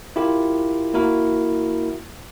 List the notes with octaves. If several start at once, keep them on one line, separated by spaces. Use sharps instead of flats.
E4 F4 G4 A#4
A#3 E4 F#4 A#4